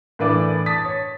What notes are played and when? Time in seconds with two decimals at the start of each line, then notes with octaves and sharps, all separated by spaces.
0.19 A2 E3 D4 B4 D5
0.66 A5 D#6 A6 B6
0.85 C#5